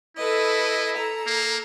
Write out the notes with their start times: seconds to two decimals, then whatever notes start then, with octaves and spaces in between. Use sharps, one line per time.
0.17 E4 A4 B4 D#5
0.97 A4 A#5
1.27 A#3